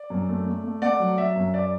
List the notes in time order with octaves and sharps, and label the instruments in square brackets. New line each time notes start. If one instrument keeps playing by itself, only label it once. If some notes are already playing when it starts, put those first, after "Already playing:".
Already playing: [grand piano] D5
F#2
A3
A3
A3
A3 D5 F#5
F#3
F#3 E5
F#2
D5